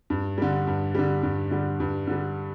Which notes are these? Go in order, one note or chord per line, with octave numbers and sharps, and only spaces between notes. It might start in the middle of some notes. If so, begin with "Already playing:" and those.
G2
D3 G3
G2
D3 G3
G2
D3 G3
G2
D3 G3